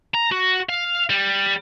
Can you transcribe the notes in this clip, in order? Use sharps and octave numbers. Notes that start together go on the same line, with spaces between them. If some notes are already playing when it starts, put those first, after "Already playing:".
A#5
F#4
F5
G3